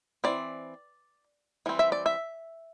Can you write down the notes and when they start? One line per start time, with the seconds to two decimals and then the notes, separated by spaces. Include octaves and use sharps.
0.24 E3 C4 D5
1.66 E3 G3 C4
1.79 E5
1.92 D5
2.06 E5